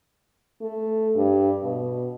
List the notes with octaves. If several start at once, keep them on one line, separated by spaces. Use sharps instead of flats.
A3
G2
B2